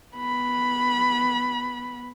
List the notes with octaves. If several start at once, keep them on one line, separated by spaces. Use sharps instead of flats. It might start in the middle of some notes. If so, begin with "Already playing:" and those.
B3 B5